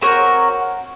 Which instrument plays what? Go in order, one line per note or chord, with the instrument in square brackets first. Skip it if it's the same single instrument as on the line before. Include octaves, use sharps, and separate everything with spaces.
[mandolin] C4 F#4 A#4 C#5